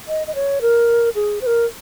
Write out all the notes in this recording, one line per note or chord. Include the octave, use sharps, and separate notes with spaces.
D#5
D#5
C#5
A#4
G#4
C5
A#4